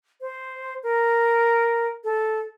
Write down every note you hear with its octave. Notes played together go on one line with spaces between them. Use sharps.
C5
A#4
A4